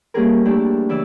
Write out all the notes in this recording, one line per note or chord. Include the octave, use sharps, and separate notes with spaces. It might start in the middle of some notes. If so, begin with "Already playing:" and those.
G3 A#3 C#4 G4 G#4 A#4
A3 A#3 D4 E4 G4
C#3 E3 E4 D5 E6